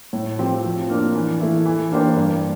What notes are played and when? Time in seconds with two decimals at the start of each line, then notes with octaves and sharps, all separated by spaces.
0.13 A2
0.38 F3 C4 G4
0.64 F3
0.89 A#3 D4 F4
1.15 E3
1.40 A3 E4
1.65 E3
1.92 A#3 D4 G4 C5
2.16 G2